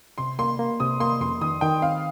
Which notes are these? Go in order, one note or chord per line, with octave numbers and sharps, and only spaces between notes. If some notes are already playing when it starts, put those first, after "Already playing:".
C3 C6
A#3 C6
A#3
C3 D#6
A#3 C6
F2 C6
D#3 D#6
D#3 G5
C4 F5